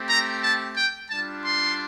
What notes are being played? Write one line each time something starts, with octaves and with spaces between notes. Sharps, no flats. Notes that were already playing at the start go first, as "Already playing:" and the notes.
Already playing: A3 C4 G4
A#5
A5
G5
G3 D4 F4 A5
C6